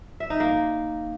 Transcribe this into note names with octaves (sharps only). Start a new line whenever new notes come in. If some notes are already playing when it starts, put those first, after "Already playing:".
E5
D#4
A#3